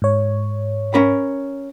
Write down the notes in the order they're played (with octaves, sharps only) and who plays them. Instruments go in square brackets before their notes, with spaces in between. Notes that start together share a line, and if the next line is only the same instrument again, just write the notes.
[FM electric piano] G#2 C#5
[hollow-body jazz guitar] C#4 A#4 B5